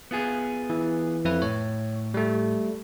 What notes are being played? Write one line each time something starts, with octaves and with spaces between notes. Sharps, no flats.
B3 F4 G#4
E3
F2 E4 B4
A2 C#5
G3 A3